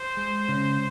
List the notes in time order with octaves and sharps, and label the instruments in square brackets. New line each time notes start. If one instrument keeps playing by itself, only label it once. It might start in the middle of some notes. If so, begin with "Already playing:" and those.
Already playing: [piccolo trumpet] C5
[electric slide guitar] G#3
C#3